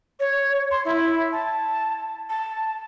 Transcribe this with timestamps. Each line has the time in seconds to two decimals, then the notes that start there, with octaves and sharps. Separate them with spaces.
0.20 C#5
0.71 C6
0.85 E4
1.32 A5
2.29 A5